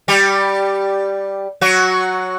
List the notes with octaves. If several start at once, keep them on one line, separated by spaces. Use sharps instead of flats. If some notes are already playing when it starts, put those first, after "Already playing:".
G3 G4
F#3 F#4